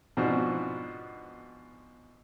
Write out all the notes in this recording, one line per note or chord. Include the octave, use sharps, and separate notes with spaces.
G#2 B2 F3 C4 D4 F#4